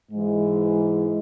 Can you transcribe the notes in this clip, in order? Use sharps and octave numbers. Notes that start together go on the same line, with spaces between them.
G#2 E3 G#3